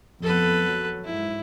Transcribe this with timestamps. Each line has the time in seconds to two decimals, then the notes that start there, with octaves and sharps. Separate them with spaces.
0.23 F2 B3 A4 B4
0.64 F#3
1.04 G#2 E4